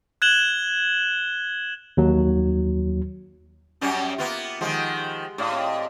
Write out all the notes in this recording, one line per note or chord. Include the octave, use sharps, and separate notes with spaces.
F#6 G#6 E7 F#7 G7
D#2 F#3
F#2 G3 C#4
A#3 B3 F4
D#3 F3 G#3 G4 F#5
A2 C#5 D5 F5
C4 D#5